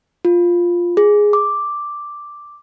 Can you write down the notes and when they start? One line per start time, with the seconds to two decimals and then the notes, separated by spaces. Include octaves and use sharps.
0.25 F4
0.97 G#4
1.33 D6